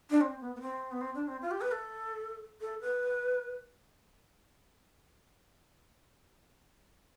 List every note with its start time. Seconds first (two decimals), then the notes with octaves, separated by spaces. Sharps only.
0.10 D4
0.21 C4
0.41 B3
0.55 B3
0.61 C4
0.91 B3
1.01 C4
1.15 D4
1.28 C4
1.42 F4
1.51 G4
1.61 B4
1.72 A4
2.61 A4
2.81 B4